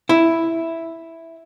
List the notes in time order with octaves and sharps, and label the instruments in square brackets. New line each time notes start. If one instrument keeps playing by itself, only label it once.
[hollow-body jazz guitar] E4